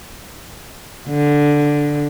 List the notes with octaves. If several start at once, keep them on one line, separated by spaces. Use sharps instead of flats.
D3